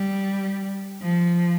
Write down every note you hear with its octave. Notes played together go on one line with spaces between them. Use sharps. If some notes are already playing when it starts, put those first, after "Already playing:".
Already playing: G3
F3